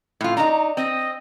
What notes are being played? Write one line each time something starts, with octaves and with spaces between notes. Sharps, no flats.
A2 F4
D4 D#4 A#5
C4 D#5